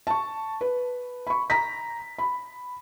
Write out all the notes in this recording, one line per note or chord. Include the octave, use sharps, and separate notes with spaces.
A5 C#6
B4
B5 C#6
A#5 A#6 B6
B5